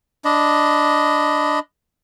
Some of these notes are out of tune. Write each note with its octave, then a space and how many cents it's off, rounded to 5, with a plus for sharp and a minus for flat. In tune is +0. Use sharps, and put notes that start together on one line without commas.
D4 +0 D#5 +0 B5 +20